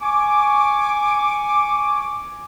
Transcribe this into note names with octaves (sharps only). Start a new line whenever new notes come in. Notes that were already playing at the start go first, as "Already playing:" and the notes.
G#5 C#6 D6